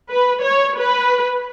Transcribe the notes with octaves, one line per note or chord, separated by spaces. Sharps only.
B4
C#5
B4